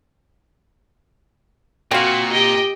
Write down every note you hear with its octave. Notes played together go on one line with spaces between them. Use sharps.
A#2 C4 F#4 F5
G4 D#5 G5